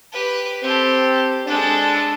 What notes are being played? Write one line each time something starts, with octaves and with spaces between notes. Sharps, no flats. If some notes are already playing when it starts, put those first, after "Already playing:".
G4 B4
C4 G4 A4 C5
G#3 D4 A4